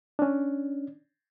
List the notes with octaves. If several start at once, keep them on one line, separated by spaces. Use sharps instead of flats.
C#4 D4